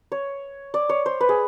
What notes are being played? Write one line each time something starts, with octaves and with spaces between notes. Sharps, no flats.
C#5
D5
C#5
C5
B4
G#4